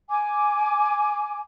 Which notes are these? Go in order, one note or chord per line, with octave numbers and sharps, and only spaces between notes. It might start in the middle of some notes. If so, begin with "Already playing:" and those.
G#5 D6